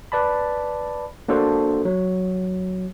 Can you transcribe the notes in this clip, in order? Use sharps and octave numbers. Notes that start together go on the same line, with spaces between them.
B4 D5 A5 B5
A#3 D4 F#4 A4 C5
F#3